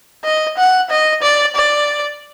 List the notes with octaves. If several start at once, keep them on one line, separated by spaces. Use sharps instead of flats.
D#5
F#5
D#5
D5
D5